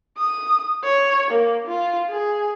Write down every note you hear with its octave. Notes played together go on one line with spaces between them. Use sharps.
D#6
C#5
A#3
F4
G#4